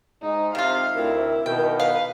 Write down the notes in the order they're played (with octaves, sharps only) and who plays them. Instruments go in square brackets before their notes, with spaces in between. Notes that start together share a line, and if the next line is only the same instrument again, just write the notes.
[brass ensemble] G#2 [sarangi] D#4
[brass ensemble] C3 [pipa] D#3 F4 [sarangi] F5
[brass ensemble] D2 C3 C4 [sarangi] E4 [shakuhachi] A#4
[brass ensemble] B2 D#3 [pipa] G5
[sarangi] B4 [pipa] F5